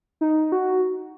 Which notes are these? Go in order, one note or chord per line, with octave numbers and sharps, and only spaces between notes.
D#4
F#4